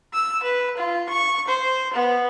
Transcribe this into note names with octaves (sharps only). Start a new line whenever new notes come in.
E6
B4
F4
C#6
C5
B3